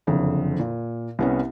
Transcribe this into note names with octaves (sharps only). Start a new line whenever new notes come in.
F#1 F2 D3
A#2
C2 B3 C#4